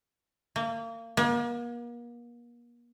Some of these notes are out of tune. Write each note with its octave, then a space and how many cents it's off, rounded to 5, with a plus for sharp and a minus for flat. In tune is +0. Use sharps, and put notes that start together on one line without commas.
A#3 -30
A#3 +40